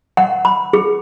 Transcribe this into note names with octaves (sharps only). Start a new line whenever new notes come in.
F#5
B5
G#4